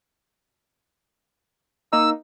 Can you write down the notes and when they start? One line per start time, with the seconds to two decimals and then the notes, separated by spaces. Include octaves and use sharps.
1.93 A#3 D#4 E6